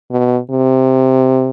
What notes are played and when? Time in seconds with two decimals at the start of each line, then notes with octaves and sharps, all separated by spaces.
0.11 B2
0.50 C3